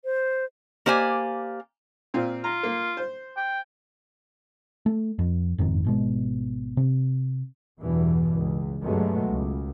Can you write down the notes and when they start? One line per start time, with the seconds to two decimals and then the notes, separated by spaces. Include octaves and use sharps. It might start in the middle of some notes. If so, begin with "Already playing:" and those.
0.05 C5
0.86 A#3 G4 C5 D5 G#5
2.14 A#2 C4 F4
2.44 F4 A#5
2.63 A#3
2.97 C5
3.37 G5
4.86 A3
5.19 F2
5.58 F#1 F2 G#2 D#3
5.85 G#1 B2 G#3
6.77 C3
7.81 E2 G2 B2 E3
8.34 C#2
8.83 G2 B2 F#3 G#3 A3
9.28 C#2